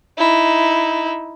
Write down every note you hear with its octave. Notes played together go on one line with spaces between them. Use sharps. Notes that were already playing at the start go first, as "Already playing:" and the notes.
D#4 E4